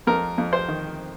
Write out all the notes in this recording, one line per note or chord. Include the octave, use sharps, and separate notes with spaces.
F2 A#4
F2
C5
D#3